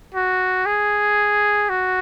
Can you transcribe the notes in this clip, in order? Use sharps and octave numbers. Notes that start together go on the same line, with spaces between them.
F#4
G#4
F#4